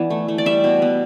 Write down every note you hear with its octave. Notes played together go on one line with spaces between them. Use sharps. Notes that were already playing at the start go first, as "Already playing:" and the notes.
Already playing: E3 B3 D5
A3
A3
D5
G3 E5
B2
B3